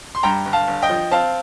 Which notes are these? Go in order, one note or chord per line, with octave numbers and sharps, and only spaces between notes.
C6
G2 G5 A#5
G1
F5 A5
G1
D#5 G5
F3
C4 F5 A5